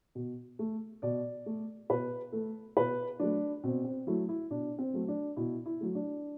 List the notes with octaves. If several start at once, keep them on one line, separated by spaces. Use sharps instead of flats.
B2
A3
B2 D5
A3
B2 B4
A3 A4
B2 B4
F#3 A3 D4
B2 C4
C4
F#3 A3 E4
E4
B2 D4
C4
F#3 A3
D4
B2 E4
E4
F#3 A3
D4